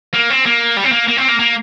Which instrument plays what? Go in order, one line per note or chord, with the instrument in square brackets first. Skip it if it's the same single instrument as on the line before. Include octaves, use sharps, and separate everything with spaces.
[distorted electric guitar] A#3
C4
A#3
G3
C4
A#3
A#3
C4
A#3
A#3